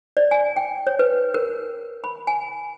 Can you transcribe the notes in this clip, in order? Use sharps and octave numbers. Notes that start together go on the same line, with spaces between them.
D5
G#5
G5
C#5
B4
A#4
B5
G#5